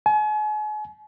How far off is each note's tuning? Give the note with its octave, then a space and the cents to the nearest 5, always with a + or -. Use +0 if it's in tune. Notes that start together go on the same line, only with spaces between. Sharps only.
G#5 +40